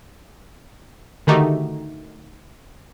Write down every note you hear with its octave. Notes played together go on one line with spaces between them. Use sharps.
D3 D#3 A3 D#4 F#4 G4